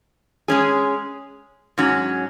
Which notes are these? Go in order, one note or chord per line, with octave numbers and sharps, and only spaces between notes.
G#3 C#4 G#4
G#2 F#3 C#4